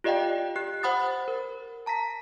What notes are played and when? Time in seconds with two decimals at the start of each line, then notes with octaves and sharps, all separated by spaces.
0.04 F4 G4 D5 D#5 F5 G5
0.56 G4 F#6
0.83 C5 F#5 B5 D#6 A6
1.28 A#4
1.86 A5 A#5 A#6 B6